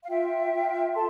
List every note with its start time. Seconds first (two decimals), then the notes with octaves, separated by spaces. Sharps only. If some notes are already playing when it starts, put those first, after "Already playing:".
0.03 F5
0.08 F4 E5 G5
0.52 F4
0.94 A4 A5 C6